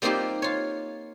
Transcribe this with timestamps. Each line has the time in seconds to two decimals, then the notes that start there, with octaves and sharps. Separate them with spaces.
0.02 G3 A#3 C4 D#4 F4 G4
0.42 F4 C#5